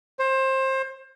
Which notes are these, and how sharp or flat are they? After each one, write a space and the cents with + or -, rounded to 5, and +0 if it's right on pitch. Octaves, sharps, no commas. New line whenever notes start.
C5 +25